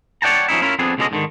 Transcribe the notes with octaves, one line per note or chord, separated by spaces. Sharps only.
C#5 D5 F#5 G5 A5 A#5
F3 C#4 D#4 E4
C#4 E4 F4 A#4
F2 B3 C4 D4 G#4
C#2 B2 D3 G#3 C#4 D#5
G#2 D3 D#3